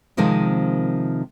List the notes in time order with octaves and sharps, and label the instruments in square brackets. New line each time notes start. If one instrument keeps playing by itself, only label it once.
[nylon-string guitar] C3 D#3 F3 G#3 A#3 C4